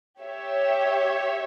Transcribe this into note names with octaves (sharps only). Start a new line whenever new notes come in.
G4 C#5 E5